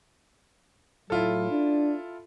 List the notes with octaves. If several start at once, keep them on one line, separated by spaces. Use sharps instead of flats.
A2 F#3 E4 F4 A4
D4